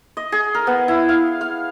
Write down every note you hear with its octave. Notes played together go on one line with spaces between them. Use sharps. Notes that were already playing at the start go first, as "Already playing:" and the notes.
D#5
G#4
A#4
B3
E4
F5
F5